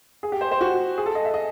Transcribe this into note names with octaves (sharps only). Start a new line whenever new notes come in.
G#4
G4
C5
C5
F#4
G#4
A4
D#5
E5
D#5